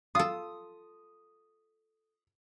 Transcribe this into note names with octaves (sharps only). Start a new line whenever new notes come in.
F4 A4 D#6